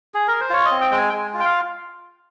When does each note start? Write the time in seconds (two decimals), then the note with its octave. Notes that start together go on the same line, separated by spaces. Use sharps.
0.14 G#4
0.28 A#4
0.40 C5
0.50 F4 C#5
0.65 D#5
0.71 C4
0.81 G5
0.91 G#3 G5
0.97 G#5
1.09 G5
1.13 G#3 G#5
1.34 F4
1.40 G5
1.45 F5